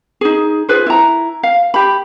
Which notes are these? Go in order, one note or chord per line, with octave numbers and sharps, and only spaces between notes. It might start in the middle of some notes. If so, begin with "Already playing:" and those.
D#4 G#4
F4 G#4 B4 C5
E4 A#5
F5
G4 B5